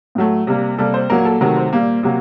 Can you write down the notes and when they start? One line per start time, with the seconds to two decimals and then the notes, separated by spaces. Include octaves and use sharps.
0.15 A2 F#3 A3
0.47 C3 G3 A#3
0.78 C3 G3 A#3 A4
0.94 C5
1.10 A#2 F#3 A#3 A#4
1.25 A4
1.41 C3 D#3 F#3 A3 A#4
1.57 C5
1.73 A#2 G3 A#3
2.03 C3 F#3 A#3